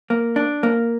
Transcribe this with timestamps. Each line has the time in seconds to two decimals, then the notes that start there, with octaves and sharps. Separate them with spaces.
0.10 A#3
0.36 D4
0.63 A#3